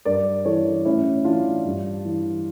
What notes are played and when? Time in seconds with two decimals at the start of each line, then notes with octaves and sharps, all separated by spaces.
0.05 G2 A#4 D5
0.45 E3 A4 C#5
0.85 A2 C#4 E4
1.25 E3 D4 F4
1.65 G2
2.05 E3